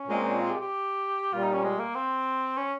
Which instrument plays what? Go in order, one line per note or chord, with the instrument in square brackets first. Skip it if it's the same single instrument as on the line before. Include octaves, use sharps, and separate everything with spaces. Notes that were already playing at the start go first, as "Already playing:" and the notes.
Already playing: [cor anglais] C#4
[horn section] A#2 G#3 C4
[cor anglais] F4
G4
G4
[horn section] A#2 G3 A#3 [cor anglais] F4
[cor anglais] D#4
C#4
G#3
A#3
C4
C#4